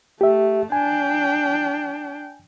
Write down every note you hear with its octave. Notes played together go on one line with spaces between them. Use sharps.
A3 G4 E5
D4 G5 G#5